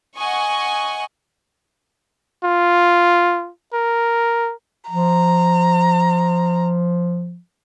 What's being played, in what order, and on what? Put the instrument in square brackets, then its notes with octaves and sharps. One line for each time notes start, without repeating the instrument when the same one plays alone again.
[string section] D#5 F#5 G#5 C#6
[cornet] F4
A#4
[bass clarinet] F3 [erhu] A#5